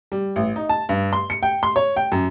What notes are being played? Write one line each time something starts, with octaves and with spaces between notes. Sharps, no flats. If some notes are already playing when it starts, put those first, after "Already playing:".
G3
A1
D#4
A5
G2
C6
C#7
G5
C6
C#5
G5
F#2